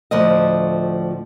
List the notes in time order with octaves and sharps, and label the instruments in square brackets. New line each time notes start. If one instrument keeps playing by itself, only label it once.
[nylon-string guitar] D2 A2 F3 F4 D#5